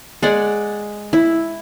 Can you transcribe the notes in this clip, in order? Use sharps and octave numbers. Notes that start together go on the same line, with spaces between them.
G#3 G#4 D5 F#5
E4